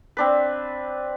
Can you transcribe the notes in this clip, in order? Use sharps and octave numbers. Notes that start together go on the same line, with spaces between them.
C4 D4 B4